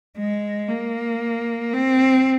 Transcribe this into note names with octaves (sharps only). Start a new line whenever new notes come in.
G#3
A#3
C4